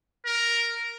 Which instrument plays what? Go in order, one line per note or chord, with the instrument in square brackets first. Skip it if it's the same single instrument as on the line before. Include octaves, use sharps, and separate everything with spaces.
[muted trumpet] A#4